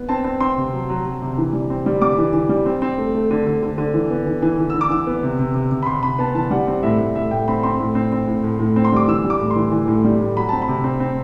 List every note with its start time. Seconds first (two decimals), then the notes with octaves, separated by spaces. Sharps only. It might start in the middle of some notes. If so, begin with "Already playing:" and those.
Already playing: B3
0.09 C4 A5
0.24 C4
0.40 C4 C6
0.58 C3
0.73 F#3
0.89 F#3
1.05 F#3
1.22 C3
1.38 E3
1.53 G3
1.70 C4
1.86 G3
2.02 G3 D6
2.18 E3
2.33 E3
2.49 G3
2.66 C4
2.82 C4
2.98 A3
3.14 A3
3.31 D3
3.47 D3
3.63 D3
3.78 D3
3.94 E3
4.10 B3
4.27 E3
4.42 E3
4.59 E3
4.70 E3 E6
4.81 D6
4.90 E3 E6
5.07 B3
5.23 C3
5.39 C3
5.54 C3
5.71 C3
5.83 B5
5.86 C3 C6
6.03 C3 B5
6.18 B3 A5
6.35 E3 A5
6.51 G3 F#5
6.67 C4
6.83 A2 E5
6.99 A2
7.15 A2 E5
7.31 A2 G5
7.48 C4 B5
7.63 C4 C6
7.80 A2
7.95 C4
8.12 C4
8.27 A2
8.44 A2
8.59 A2
8.76 C4
8.85 C6
8.93 G3 D6
9.08 E3 E6
9.24 G3
9.30 D6
9.40 A2
9.51 C6
9.56 E3
9.72 E3
9.88 A2
10.04 G3
10.20 A2
10.37 F#3 B5
10.49 C4 A5
10.62 B5
10.68 C3
10.84 C4
11.00 C4